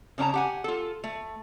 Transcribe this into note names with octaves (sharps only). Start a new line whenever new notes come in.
C#3 C#4 D4 A5 A#5
G4 F#5 G#5
F4 A4
A3